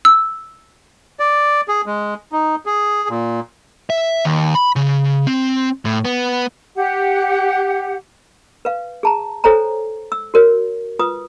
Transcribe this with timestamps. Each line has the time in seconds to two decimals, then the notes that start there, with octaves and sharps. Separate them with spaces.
0.05 E6
1.20 D5
1.68 G#4
1.86 G#3
2.32 D#4
2.66 G#4
3.09 A#2
3.90 E5
4.25 D#2
4.55 B5
4.76 C#3
5.27 C4
5.85 A2
6.05 B3
6.75 G4 F#5
8.65 B4 F5
9.03 G#4 A5 A#5
9.44 A4 C5 C#5 G#5 A#5
10.12 E6
10.34 F#4 A#4 C#5
10.99 F4 B4 D#6